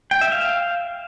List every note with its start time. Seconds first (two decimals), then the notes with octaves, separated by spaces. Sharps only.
0.11 G5
0.21 E5
0.32 F5